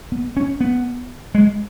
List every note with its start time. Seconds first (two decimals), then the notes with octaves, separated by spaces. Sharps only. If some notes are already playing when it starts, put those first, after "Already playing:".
0.12 B3
0.37 C#4
0.61 B3
1.35 G#3